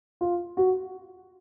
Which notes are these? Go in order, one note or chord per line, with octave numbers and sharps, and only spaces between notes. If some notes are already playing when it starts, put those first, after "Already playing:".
F4
F#4